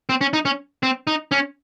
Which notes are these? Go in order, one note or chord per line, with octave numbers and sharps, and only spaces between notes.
C4
C#4
D#4
C#4
C4
D#4
C#4